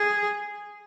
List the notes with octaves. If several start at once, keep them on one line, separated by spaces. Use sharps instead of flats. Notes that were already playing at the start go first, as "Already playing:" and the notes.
Already playing: G#4